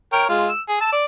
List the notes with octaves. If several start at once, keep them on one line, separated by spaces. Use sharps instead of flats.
A#4 C#5 G5
G#3 F4
E6
G#4
A5 E6
D5